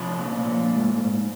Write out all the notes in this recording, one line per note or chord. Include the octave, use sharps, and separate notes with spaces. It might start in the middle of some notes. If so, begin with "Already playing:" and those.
Already playing: C3 F3 C#5
A#2
A#2
G#2
G#2